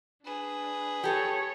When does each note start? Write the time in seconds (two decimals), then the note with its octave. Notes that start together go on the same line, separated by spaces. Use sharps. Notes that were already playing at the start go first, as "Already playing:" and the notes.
0.25 D4 G#4 B4
1.04 G4 A4 C#5